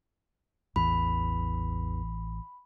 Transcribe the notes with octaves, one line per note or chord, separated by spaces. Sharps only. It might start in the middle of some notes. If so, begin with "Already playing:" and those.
A1 E2 E3 B5